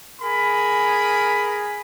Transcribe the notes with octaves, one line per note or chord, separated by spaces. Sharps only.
G#4 A#4 B5